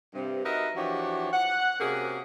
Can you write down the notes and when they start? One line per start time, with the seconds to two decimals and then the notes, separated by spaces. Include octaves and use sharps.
0.14 G2 C3
0.44 D#4 F#4 A#4 B4 D#5 E5
0.76 E3 F3 D4 F#4 G4 C#5
1.33 F#5
1.80 C3 A#3 C#4 F#4 G#4